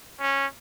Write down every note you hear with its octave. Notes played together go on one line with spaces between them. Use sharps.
C#4